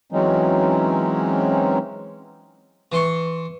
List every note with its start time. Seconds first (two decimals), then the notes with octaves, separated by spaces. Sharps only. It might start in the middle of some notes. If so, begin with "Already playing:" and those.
0.12 E3 F#3 G#3 C4 C#4 D#4
2.92 E3 C6 C#6